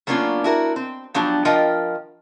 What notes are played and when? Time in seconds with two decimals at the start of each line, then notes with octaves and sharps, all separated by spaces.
0.07 F#3 A#3 B3 C#4 D4 F4
0.44 E4 F#4 A#4
0.76 C4
1.14 F3 F#3 B3 D4 G4
1.45 F3 F4 A#4 D#5 F#5 G5